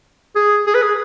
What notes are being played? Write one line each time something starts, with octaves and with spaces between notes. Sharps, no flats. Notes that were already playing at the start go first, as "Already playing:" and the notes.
G#4
G#4
B4
G#4